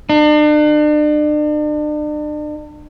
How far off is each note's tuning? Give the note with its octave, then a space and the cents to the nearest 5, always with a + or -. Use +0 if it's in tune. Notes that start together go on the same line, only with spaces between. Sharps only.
D4 +40